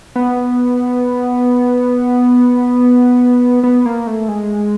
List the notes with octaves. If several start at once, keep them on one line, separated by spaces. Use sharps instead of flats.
B3
B3
A#3
A3
G#3